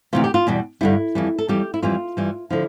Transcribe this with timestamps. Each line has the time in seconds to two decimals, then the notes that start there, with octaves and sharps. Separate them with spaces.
0.13 D2 C3 E3 F4
0.24 G4
0.34 F4
0.47 E2 B2 G3
0.81 G2 D3 G3 E4
1.15 F2 E3 G3
1.38 A4
1.48 F2 E3 G3 G4
1.74 E4
1.82 F2 E3 G3 F4
2.17 G2 E3 G3
2.50 D3 F3 E4